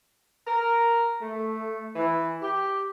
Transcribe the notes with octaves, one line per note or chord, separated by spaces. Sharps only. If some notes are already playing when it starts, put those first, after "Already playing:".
A#4
A3
E3
G4